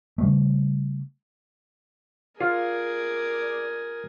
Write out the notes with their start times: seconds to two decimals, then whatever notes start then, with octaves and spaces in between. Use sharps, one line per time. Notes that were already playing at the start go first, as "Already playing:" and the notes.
0.18 C#3 G3 A3
2.41 F4 G#4 A#4 D5